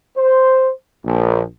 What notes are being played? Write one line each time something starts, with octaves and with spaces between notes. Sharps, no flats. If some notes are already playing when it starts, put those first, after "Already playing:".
C5
A#1